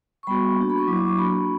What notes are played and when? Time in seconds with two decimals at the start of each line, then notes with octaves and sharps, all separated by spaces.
0.23 C#6
0.27 G3 B3 F#4 B5
0.57 A#3 D4 F#4
0.70 B5
0.78 C#6
0.87 F#3 A#3 E4 D6
0.97 D6
1.07 C#6
1.17 A#3 D4 F#4 B5